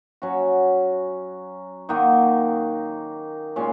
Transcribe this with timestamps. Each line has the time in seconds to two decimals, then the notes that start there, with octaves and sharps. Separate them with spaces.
0.22 F#3 C#4 F#4
1.89 D#3 A#3 D#4 F#4
3.56 A#2 G#3 C#4 F4